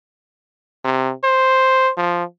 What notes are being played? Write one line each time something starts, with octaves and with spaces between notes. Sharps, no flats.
C3
C5
F3